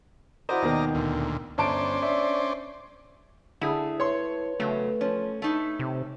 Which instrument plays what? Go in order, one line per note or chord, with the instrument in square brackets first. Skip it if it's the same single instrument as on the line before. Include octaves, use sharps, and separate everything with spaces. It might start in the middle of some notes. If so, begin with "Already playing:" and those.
[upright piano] E4 F#4 C5 [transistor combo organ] D5 D#5 A#5
[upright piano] D#2 B2 D#3
[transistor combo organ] D2 A#2
[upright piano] G1 A5 D7 [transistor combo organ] C#4 C5 D5
[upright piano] D4 E5
[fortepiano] D3 G#4 [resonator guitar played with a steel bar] A3 [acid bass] E4
[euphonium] B4 [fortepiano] C#5 C6
[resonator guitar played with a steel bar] E2 C#3 F#3 [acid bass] A3
[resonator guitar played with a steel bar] F3 [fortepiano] C#4
[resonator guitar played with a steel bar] A3 D#4 E4
[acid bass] C3